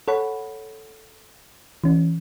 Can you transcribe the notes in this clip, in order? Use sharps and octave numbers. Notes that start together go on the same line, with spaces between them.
A4 C#5 F#5 B5
E3 C#4